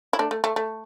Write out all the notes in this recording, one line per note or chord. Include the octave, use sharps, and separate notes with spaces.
E4
A3 D4
A3
A3
A3